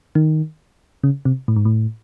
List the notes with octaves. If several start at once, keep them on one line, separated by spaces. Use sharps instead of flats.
D#3
C#3
C3
A2
G#2
A2